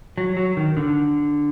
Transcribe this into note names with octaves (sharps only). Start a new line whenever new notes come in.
F#3
F#3
D#3
D3